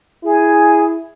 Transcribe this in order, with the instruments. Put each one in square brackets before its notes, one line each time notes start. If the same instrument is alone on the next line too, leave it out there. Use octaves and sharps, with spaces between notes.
[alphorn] E4 [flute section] G#4